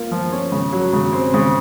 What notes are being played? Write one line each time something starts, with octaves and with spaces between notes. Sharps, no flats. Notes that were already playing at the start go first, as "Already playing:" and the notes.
Already playing: A#3 F4
F3
C#4
C#3
F#3
C#3
C4
C#3